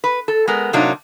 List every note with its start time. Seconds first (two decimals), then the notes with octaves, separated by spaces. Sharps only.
0.04 B4
0.28 A4
0.47 G#3 B3 A#4
0.73 A2 C3 F#3 A#3 D4 D#4